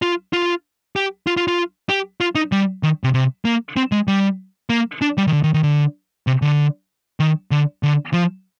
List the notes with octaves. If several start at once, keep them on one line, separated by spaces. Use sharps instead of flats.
F4
F4
G4
F4
F4
F4
G4
F4
D#4
G3
D#3
C3
C3
A#3
C4
G#3
G3
A#3
D4
G3
D#3
D3
D#3
D#3
D3
C3
D3
D#3
D3
D3
F3